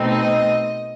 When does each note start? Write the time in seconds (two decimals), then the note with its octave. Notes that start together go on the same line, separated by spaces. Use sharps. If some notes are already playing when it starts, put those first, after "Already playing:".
Already playing: B2 A3 C4 D#4
0.10 D#5